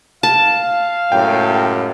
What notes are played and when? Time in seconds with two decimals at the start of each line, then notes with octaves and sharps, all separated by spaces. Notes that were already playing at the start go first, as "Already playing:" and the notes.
0.23 F5 A5
1.12 C#2 F#2 A2 G5